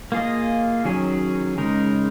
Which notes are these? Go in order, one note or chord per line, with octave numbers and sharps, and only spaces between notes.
A#3 F4 G#4 D#5
D#3 F#3 C#4 G#4
C#3 G#3 D#4 A#4